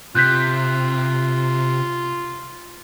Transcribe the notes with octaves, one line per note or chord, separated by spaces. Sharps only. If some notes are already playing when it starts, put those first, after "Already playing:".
C3 F4 F#6 G6 B6